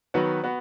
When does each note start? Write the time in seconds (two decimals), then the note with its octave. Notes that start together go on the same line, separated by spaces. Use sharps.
0.14 D#3 F#3 B3 F#4 B4
0.44 B3 F#4